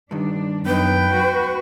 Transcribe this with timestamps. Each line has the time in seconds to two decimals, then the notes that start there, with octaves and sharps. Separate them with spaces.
0.11 G2 D#3 D4
0.66 F#2 B3 D#4 B4 G5
1.12 F#4